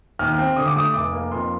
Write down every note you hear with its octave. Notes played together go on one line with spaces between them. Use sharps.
D#2 F6
C4
D3 D#6
D6
A3 D#6
F1 D6
A#3
F2 C6